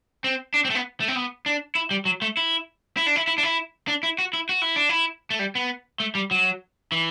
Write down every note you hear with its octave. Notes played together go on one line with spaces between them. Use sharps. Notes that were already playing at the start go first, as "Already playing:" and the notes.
C4
D4
C4
A3
B3
A3
C4
B3
D4
E4
G3
F#3
A3
E4
E4
D4
E4
E4
D4
E4
D4
E4
F#4
E4
F#4
E4
D4
E4
A3
G3
B3
A3
G3
F#3
E3